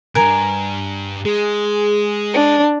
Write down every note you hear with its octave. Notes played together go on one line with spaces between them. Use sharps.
B1 G2 A#4 G#5
G#3 G#4
D4